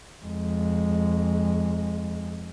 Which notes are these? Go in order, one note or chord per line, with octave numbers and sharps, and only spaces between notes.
F2 G#3